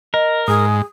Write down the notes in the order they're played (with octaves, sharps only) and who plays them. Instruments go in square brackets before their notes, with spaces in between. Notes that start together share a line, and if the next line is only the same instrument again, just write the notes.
[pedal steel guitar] A#4 [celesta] D#5
[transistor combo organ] G#2 [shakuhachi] G#4 [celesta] D#6